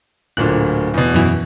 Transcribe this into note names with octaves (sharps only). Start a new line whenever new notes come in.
D1 A#2 D3 F#6
E2 B2
F#2 E3